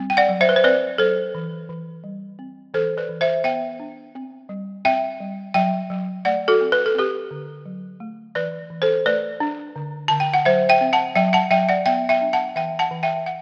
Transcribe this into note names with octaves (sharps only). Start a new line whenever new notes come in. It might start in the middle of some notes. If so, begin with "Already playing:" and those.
Already playing: G3 C4
G5
D5 F#5
F#3
C5 E5
B4
C5
C4 B4 D5
F#3 A4 C5
E3
E3
G3
C4
E3 A4 C5
B4 D5
E3
C5 E5
B3 E5 G5
D4
C4
G3
C4 E5 G5
G3
F#3 E5 G5
F#3
A3 D5 F#5
F#4 A4
C4
B4
A4
C4 G4 B4
D3
F#3
A3
E3 B4 D5
E3
A4 C5
A3 B4 D5
D4
D3
D3 A5
G5
F#5
F#3 C5 E5
E5 G5
C4
F#5 A5
F#3 E5 G5
F#5 A5
F#3 E5 G5
D5 F#5
B3 E5 G5
E5 G5
D4
F#5 A5
E3 E5 G5
F#5 A5
E3
E5 G5
F#5